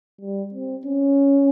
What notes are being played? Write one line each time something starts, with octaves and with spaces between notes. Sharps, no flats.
G3
C4
C#4